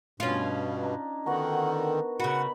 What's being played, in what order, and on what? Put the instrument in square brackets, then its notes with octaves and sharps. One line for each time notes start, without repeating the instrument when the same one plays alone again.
[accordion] G2 B2 [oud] C#4 F4
[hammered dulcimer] D4 D#4
[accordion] D3 D#3 [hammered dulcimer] B3 F#4 A#4 [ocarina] F#5
[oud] C#3 F#4 [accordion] F#5 [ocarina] B5